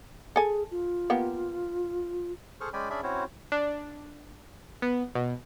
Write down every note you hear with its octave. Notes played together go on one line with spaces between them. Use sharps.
G#4 A4 G#5
F4
A#3 B3 G4
G#4 A4 C5 C#6 F6
G#3 C#4 D5 G5 G#5 B5
C#4 D4 G#4 D5 E5 B5
C4 C#4 E4 F#4 C5 C#5
D4
B3
B2